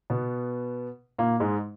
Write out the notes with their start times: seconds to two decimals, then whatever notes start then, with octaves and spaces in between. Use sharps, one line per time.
0.10 B2 B3
1.18 A#2 A#3
1.40 G#2 G#3